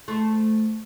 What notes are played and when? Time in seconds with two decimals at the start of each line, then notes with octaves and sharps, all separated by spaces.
0.08 A3 C5